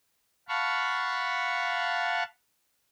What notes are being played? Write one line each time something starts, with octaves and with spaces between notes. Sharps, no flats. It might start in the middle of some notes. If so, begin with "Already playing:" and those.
F5 F#5 A5 B5 C#6